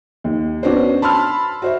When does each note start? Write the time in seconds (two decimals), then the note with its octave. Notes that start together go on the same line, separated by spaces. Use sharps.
0.24 D#2
0.63 B3 C#4 D4 F#4 B4 C5
1.02 A5 B5 C6 E6 F6
1.62 F#4 C5 E5